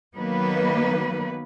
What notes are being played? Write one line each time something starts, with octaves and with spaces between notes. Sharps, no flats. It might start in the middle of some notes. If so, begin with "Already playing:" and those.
D#3 F#3 A#3 B3 B4